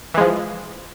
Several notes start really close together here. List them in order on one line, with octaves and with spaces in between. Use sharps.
E3 G#3 F3